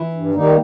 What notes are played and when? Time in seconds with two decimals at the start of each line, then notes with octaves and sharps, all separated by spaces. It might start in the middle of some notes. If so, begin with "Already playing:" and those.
Already playing: E3 E4
0.13 G2
0.34 D#3 G3 A#3 D#4